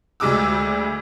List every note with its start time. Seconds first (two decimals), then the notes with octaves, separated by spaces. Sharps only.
0.20 D2 G3 G#3 D6 E6